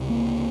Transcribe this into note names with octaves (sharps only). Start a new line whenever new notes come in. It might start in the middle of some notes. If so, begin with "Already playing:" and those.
Already playing: C#2 C3
A#3